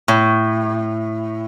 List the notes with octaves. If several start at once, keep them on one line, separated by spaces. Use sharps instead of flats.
A2